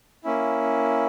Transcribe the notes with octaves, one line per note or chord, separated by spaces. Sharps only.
A#3 C#4 E4